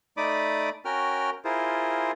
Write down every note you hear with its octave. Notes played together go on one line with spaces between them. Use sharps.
A3 D#4 D5 B5 D6 D#6
C#4 F#4 A#4 G5 F6
E4 F4 G#4 A#4 C5